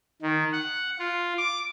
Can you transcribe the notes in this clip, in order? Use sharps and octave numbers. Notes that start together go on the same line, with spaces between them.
D#3
F#5
F4
D6